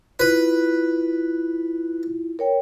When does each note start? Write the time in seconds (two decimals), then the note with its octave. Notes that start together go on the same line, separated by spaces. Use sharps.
0.20 E4 F4 B4
2.39 A#4 C#5 G5